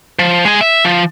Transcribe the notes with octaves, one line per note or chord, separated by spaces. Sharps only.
F3
G#3 G#4
E5
F3